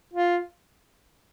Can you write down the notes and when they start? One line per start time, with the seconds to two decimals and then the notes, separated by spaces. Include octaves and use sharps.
0.14 F4